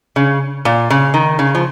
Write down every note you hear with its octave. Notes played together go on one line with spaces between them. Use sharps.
C#3
A#2
C#3
D#3
C#3
F3